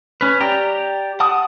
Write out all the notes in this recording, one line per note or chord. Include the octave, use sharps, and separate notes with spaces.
C#4 B4
G4 D5 G5 A#5
F#5 A5 D6 D#6